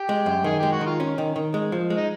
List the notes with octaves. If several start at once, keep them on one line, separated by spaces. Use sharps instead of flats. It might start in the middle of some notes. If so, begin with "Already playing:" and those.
Already playing: G4
G#3
F#2
D#3 G#4
G#3 G4
F#4
D#3
F4
C#4
D#3
D#3
G#3
F3
G#3
D#4